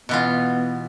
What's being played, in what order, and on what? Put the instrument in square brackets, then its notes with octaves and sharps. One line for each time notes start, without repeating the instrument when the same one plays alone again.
[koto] B2 E3 F4 [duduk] B3